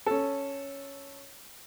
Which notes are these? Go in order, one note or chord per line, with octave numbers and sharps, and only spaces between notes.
C#4 A4